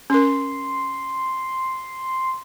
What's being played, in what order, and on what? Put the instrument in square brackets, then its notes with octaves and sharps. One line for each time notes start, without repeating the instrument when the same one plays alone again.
[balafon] C#4 A#4 [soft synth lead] C6